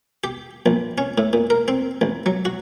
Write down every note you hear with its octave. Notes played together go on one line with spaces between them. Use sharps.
G4
A#1
C#4
A2
A#2
A#4
C4
A1
F#3
F#4